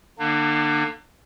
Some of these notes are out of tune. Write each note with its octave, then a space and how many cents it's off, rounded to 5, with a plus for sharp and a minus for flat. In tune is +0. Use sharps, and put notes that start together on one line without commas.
D3 +30 A#3 +0 D4 +40